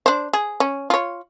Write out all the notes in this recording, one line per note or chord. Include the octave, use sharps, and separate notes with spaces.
D4 C5
G#4
C#4
F4 C#5